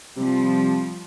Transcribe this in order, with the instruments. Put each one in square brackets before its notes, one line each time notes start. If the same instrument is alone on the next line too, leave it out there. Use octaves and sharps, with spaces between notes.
[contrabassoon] C3 [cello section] F3 G3